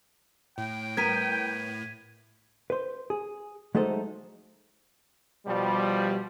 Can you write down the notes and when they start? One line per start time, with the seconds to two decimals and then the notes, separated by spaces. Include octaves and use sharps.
0.58 A2 G5
0.97 B3 A#4 G#6 B6 D#7
2.70 B4 C5
3.10 G#4
3.75 F#3 G#3 A3 D#4 A4 C5
5.46 B2 F3 G3